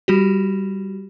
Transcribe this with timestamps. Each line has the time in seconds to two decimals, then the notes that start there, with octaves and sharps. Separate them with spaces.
0.08 G3 F#4 G4